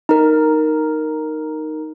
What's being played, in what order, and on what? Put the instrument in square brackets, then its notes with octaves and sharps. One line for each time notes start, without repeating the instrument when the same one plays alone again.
[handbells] D#4 A#4